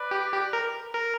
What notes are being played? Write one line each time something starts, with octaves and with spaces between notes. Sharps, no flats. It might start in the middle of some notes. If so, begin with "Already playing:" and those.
Already playing: B4 D5
G4
G4
A#4
A#4